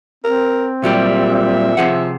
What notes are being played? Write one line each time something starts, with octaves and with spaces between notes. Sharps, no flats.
C4 A#4
A#2 F#3 G3 G4 E5
E5
C3 F3 G#4 F#5